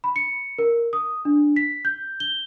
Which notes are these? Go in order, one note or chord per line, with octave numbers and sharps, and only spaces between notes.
B5
C#7
A#4
D#6
D4
B6
G6
G7